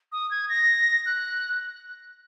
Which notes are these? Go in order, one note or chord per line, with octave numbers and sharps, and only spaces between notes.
D#6
G#6
A#6
F#6